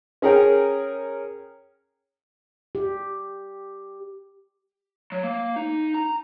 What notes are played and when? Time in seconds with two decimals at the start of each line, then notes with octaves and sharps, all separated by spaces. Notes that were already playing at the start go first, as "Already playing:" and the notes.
0.22 C#4 G#4 A#4 G5
2.75 G4
5.12 F#3
5.23 A#3
5.56 D#4
5.94 A#5